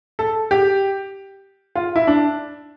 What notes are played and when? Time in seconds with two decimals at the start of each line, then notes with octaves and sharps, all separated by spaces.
0.19 A4
0.51 G4
1.76 F4
1.96 E4
2.07 D4